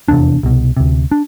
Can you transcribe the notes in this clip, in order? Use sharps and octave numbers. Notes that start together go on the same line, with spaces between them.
F1 E2 C3 D4
C2 B2
D2 C3
D4